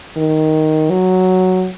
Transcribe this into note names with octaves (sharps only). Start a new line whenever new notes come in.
D#3
F#3